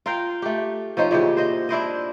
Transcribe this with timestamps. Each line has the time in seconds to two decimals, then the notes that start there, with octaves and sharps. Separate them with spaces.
0.06 F4 A#4 F5 G5
0.42 A3 G4
0.97 F3 C#4 D#4 C5
1.11 A#2 C#3 E3 G4
1.37 C5 D#5
1.69 D4 E4 C5 D#5